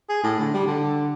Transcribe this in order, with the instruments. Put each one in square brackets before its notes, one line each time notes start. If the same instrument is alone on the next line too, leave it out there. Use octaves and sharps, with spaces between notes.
[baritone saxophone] G#4
A2
D3
G3
D3